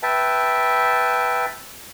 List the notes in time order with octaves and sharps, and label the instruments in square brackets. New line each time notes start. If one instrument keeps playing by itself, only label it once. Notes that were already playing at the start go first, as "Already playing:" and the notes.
[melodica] B4 E5 G5 A5